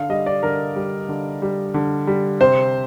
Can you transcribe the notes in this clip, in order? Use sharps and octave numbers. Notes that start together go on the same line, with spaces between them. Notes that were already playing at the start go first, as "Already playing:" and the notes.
Already playing: D3 F5
G3 D#5
D5
D3 A#4
G3
D3
G3
D3
G3
C3 C5